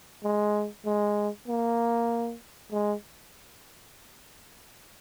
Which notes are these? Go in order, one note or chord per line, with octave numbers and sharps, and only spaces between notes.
G#3
G#3
A#3
G#3